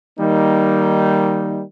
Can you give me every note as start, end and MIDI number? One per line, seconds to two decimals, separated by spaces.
0.18 1.62 51
0.18 1.62 55
0.18 1.62 58
0.18 1.62 63